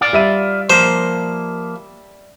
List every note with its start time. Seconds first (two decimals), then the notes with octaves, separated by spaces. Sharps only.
0.01 F4 D5
0.13 G3 E5 D#7
0.70 F3 A#3 C5